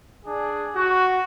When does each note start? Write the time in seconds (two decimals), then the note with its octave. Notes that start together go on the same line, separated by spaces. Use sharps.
0.25 D4 G#4
0.74 F#4